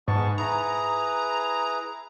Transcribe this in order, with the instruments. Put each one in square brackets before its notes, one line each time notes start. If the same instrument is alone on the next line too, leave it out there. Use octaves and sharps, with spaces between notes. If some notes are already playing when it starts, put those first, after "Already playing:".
[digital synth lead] G#2 [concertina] B3 A5 C#6
[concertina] E4 G#4 B4 [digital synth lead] A#5